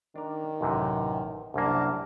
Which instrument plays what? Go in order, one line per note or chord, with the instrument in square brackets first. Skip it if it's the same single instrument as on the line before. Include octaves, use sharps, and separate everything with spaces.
[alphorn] D#3 [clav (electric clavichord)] D4 A#4
[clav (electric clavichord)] A1 F#2 C3
[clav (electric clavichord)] C2 F#2 A#3 [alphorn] D4